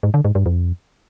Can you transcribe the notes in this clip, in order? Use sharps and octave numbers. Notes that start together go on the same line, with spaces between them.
G#2
D3
G#2
G2
F2